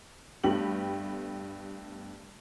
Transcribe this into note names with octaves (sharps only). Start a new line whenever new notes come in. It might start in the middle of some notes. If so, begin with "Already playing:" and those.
G2 A3 B3 G4 F#7